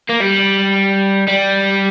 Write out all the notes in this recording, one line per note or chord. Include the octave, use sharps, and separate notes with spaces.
A#3
G3
G3